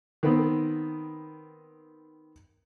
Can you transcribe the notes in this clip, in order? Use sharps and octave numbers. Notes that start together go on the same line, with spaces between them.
D#3 B3 C4